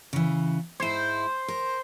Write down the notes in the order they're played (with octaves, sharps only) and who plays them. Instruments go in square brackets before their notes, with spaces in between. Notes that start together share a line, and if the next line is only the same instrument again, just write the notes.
[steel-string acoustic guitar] C#3 E3
[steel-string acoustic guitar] G#2 E4 [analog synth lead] C5
[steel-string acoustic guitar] A#4